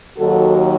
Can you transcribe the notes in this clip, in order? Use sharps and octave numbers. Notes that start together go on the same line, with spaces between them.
D#2 D#3 F#3 F#4 A4